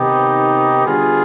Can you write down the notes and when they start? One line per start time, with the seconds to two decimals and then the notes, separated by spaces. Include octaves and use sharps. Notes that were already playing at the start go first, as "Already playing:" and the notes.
Already playing: C3 D#3 B3 D#4 G4
0.85 D3 G3 B3 F4 G#4